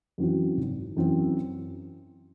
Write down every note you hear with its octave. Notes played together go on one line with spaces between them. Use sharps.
F#2 E3 C4 F#4
G#1
F#2 E3 C4 F#4